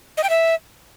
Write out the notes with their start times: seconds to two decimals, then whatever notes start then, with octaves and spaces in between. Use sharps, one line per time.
0.17 D#5
0.23 G5
0.29 E5